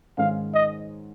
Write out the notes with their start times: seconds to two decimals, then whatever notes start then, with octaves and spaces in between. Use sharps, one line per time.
0.17 G#2 D#3 G#3 C#4 F5
0.54 D#5